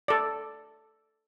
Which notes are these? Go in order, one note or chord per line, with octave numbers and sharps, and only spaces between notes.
A4 D5